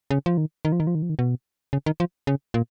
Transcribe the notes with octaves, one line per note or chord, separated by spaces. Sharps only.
C#3
F3
D#3
D#3
F3
D#3
F3
D#3
F3
D#3
B2
C#3
D#3
F3
C#3
A#2